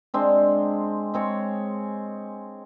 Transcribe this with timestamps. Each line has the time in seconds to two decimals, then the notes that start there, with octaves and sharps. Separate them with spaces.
0.14 G#3 C4 D4
1.14 G#3 C4 C#5